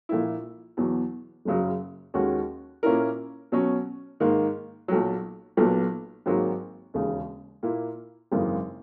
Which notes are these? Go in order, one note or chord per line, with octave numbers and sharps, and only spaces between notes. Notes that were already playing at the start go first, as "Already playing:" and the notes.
A#1 A#2 A#3 E4
E2 B2 F#3
F#1 F#2 C#3 F#3
D#2 D#3 G#3 C#4 F#4
A#2 A#3 C#4 E4 A#4
B2 F#3 C#4
G#2 D#3 A#3
B1 A#2 F#3
B1 A#2 F#3 B3
G#1 G#2 F#3 A#3
E1 D#2 C#3
A#2 A#3 E4
G#1 F#2 C#3 E3 A#3